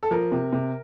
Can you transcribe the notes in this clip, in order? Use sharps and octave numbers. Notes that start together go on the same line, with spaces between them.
A4
F3 A#4
C3
C3